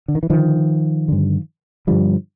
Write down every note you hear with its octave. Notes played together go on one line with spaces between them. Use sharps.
D3
D#3
E3
G2 D3 D#3 F3
G2 D3
G2 D3 F3 G3